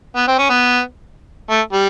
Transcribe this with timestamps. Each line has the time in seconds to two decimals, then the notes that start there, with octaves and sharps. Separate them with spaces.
0.16 B3
0.28 C4
0.39 C#4
0.50 B3
1.50 A3
1.73 G3